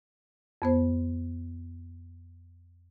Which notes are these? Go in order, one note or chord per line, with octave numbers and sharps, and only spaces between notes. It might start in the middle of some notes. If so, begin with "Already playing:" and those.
F2 B3 C5